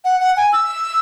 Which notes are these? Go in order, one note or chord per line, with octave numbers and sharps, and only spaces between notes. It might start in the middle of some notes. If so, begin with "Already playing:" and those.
F#5
F#5
G#5
E6